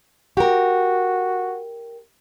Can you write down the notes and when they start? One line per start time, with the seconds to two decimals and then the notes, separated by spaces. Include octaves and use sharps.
0.37 F#4 G4 A#4